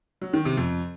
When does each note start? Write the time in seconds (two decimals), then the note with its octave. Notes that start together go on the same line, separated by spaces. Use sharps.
0.22 F#3
0.33 D#3
0.45 C3
0.57 F2